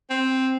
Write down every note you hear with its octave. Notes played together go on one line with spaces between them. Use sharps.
C4